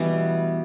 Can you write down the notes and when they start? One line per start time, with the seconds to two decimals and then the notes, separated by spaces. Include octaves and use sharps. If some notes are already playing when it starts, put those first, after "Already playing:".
Already playing: B2 E3 G3 A3 B3